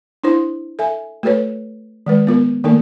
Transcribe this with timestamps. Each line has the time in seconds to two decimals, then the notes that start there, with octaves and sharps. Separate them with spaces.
0.24 D4 E4 C5 C6
0.79 A4 E5 G#5
1.23 A3 F#4 A4 B4 C#5
2.06 D#3 G#3 B4
2.27 B3 F4 A#4
2.64 D#3 A3 A#3 D#4 A4 A#4